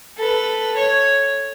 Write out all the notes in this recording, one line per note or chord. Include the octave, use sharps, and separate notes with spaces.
A4 B4
C#5